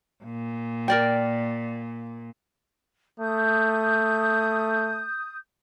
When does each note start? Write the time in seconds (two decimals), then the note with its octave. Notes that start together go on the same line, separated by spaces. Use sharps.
0.24 A#2
0.88 A#4 D5 G5
3.20 A3 D#6 G6